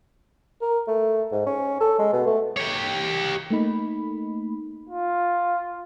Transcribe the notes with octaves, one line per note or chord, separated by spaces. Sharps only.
A#4
A3
G#2
C#4
A4
G#3
B2
A3
G4 C#5
A3 A#3 D#4 B5
F4